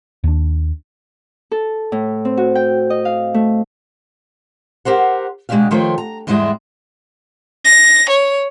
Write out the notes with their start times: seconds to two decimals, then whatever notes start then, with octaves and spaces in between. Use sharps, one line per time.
0.24 D#2 D4
1.52 A4
1.92 A2
2.25 C4
2.37 F#4
2.55 G5
2.90 D#5
3.05 F5
3.34 A3
4.85 G4 A#4 C5 F#5
5.49 B2 G#3 A3 D4 G4 F5
5.71 D#3 F3 A3 C5 C#5 G5
5.98 A#5
6.27 E2 G#2 G3 G#3 E4 D#5
7.66 A#6
8.10 C#5